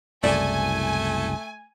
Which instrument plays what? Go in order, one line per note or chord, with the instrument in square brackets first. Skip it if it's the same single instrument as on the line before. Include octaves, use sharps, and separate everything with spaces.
[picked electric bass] F#1 C2 [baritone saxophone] A3 [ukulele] D5 [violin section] G#5